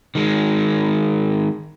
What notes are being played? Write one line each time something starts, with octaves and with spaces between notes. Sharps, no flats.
D#3 G#3